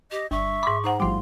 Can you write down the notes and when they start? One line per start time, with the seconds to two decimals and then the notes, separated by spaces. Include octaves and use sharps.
0.12 G4 D#5
0.31 G1 E5 C#6
0.63 G#2 B5 D6
0.84 D#4 C5 F#5 A#5
1.00 A1 F3 G3 C6